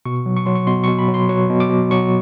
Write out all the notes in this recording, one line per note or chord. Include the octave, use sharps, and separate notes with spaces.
B2 C#6
F#3
C#6
F#3 C6
C#6
B2 C6
C#6
B2
B5
F#3
C6
F#3 C#6
B2
D6
B2
F#3 C#6